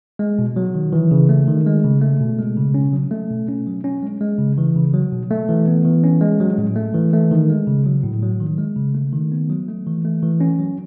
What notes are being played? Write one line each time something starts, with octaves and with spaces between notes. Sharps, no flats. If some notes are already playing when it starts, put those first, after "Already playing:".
G#3
B2
F#3
D#3
E3
C#3
A3
D#3
G#3
C#3
A3
B2
G#3
C#3
C#4
F#3
A3
B2
C#4
F#3
C#4
G#3
G#3
C#3
E3
C#3
F#3
B2
A3
E3
B3
E3
C#4
G#3
F#3
A2
A3
E3
A3
D#3
G#3
C#3
F#3
A2
F#3
D#3
G#3
C#3
A3
D#3
B3
F#3
A3
E3
A3
E3
C#4
F#3